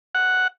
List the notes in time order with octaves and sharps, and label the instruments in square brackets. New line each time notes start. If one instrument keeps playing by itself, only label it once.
[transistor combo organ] F#5